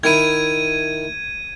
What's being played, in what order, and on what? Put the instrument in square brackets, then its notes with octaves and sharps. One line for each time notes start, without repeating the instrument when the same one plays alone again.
[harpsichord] D#3 E4 [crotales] G#6 D#7